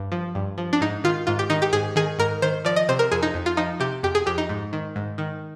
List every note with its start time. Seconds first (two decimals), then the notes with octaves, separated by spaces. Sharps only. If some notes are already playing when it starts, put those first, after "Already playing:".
Already playing: G2
0.12 F3
0.35 G2
0.58 F3
0.73 D4
0.81 G#2 D#4
1.04 D#3 F4
1.27 G#2 F4
1.39 G4
1.50 D#3 D#4
1.62 G4
1.73 G#2 G#4
1.96 D#3 G#4
2.19 G#2 A#4
2.42 D#3 C5
2.65 F3 D5
2.76 D#5
2.89 C3 C5
2.99 A#4
3.12 F2 G#4
3.23 D#4
3.34 F2
3.46 F4
3.57 F3 D#4
3.80 C3 G4
4.03 F2 G4
4.15 G#4
4.26 F2 G4
4.38 D#4
4.49 G#2
4.73 D#3
4.96 G#2
5.18 D#3